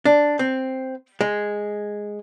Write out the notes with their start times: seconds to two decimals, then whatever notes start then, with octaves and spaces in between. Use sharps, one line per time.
0.05 D4
0.39 C4
1.21 G#3